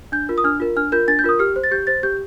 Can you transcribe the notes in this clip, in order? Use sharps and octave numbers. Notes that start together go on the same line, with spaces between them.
D4 G6
F4 A#4
D#6
D4 F6
F4 A#4
D4 F6
F4 A#4 G6
D4 A6
G6
F4 A#4 D#6
G4 F6
C5
A6
G4 G6
C5 A6
G4 G6